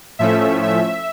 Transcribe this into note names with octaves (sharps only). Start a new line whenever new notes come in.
A2 F3 A3 C#4 E5
E5